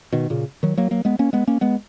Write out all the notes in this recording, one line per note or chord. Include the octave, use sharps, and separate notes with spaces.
B2 D#3
A#2 C#3
D#3 F#3
F#3 A#3
F#3 A#3
G#3 B3
A#3 C#4
G#3 B3
A#3 C#4
G#3 B3